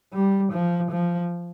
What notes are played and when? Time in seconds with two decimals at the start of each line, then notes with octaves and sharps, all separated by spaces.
0.13 G3
0.53 F3
0.91 F3